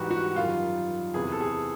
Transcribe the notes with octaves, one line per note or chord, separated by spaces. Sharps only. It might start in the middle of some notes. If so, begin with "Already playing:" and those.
Already playing: G#2 E3 G3 F#4 G4
F#4
F#2 D#3 G3 F4
E2 C3 E3 G#4
A4
G#4